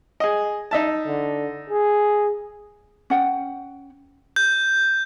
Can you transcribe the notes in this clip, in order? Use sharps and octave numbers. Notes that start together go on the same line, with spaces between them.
G#4 D#5
D#4 E5 A5
D3
G#4
C#4 F#5 G5
G6